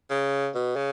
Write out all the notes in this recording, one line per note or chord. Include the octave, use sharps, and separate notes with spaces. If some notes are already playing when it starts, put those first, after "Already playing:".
C#3
B2
C#3